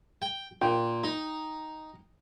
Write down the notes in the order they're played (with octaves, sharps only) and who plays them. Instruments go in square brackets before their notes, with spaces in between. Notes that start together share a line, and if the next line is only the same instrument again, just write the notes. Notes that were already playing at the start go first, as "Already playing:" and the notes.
[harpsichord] G5
[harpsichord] A#2 [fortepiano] G5
[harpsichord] D#4